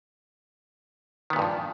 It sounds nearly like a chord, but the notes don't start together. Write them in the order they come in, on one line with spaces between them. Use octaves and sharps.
D#3 B3 A#2 G2 F3